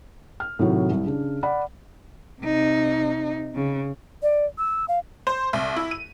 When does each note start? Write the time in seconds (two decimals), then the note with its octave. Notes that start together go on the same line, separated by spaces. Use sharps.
0.40 F6
0.59 A2 C3 D#3 F#3
0.91 C2
1.06 C#3 D4
1.43 D5 F#5 B5
2.42 C3 D#4
3.55 C#3
4.23 D5
4.58 E6
4.88 F5
5.27 C5
5.53 C2
5.76 E4
5.91 D#7